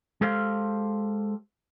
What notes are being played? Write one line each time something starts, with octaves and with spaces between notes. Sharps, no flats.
G#3 G4 A4 C5 F5